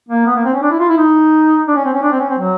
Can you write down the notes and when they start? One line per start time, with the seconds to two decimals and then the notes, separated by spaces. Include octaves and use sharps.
0.08 A#3
0.26 B3
0.35 A#3
0.44 C4
0.53 C#4
0.62 D4
0.71 E4
0.79 F4
0.89 E4
0.97 D#4
1.67 D4
1.75 C#4
1.85 C4
1.93 C#4
2.02 D4
2.11 C4
2.19 C#4
2.29 C4
2.38 F#3